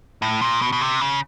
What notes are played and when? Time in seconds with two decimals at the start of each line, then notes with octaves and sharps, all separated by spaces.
0.22 A2
0.41 A#2
0.62 B2
0.72 B2
0.81 C3
1.00 C#3